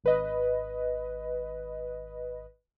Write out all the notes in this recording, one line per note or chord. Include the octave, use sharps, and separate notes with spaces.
G#1 B4 D#5